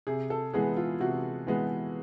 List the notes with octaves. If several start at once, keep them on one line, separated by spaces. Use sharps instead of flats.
C3 G#4
A4
E3 G#3 B3 G#4
F4
C3 F#4
E3 G#3 B3